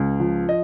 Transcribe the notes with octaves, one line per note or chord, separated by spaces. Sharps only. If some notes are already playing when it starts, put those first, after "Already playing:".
Already playing: C#2
F3
D#5